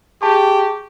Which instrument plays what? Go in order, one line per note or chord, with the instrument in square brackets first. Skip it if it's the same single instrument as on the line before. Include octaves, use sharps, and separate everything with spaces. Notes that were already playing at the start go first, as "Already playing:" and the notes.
[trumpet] G4 [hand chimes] G#4 A5 C#6